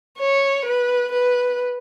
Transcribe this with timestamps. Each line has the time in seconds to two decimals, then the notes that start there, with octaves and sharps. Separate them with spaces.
0.19 C#5
0.65 B4
1.12 B4